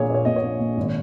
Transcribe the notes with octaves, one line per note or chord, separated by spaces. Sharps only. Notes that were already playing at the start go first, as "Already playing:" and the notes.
Already playing: A#1 A#2 G#4 C#5
A#2 C#5
A#2 D#5
C#5
A#1
A#1
G#1